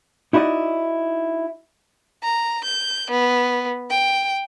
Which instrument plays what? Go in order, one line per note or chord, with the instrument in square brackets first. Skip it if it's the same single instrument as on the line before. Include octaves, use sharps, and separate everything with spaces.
[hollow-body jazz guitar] D#4 E4 F#4 D5 D#5
[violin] A#5
G6
B3
G5